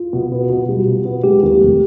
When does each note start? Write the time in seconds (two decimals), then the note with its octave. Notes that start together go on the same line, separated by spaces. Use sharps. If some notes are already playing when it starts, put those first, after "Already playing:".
Already playing: F4
0.13 B2
0.32 B3
0.50 B2
0.69 G3
0.87 B2
1.05 B3
1.24 G#3 G4
1.43 D#2
1.61 F1